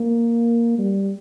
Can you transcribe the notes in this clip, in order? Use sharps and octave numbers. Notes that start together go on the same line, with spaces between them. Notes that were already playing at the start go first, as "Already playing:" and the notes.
Already playing: A#3
G3